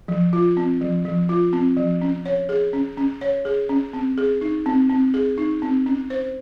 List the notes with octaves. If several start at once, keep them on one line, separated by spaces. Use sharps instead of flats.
F3
F4
C4
F3
F3
F4
C4
F3
C#4
C#5
G#4
C#4
C#4
C#5
G#4
C#4
C4
G#4
D#4
C4
C4
G#4
D#4
C4
C#4
C5